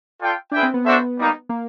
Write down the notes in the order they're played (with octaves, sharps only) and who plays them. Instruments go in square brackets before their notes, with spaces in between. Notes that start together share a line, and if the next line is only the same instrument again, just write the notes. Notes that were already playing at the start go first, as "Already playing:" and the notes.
[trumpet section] F4 A4 D5 G5
[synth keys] D4 [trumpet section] E4 G#4 B4 E5 G5
[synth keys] C4
B3
[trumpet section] D4 F#4 A4 C5 E5
G3 A#3 D#4
[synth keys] A#3